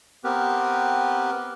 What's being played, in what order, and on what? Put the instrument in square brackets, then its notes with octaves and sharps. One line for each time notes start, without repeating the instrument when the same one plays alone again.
[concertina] B3 C4 G4 A#4 B4